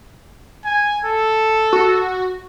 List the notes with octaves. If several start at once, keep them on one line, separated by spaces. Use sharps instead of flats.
G#5
A4
F#4